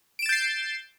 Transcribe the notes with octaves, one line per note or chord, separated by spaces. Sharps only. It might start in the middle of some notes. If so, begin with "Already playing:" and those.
G6 A6 C7 D7 E7